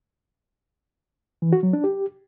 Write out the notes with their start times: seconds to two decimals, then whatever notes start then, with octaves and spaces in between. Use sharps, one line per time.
1.42 E3
1.53 F#4
1.63 F#3
1.73 D4
1.84 G4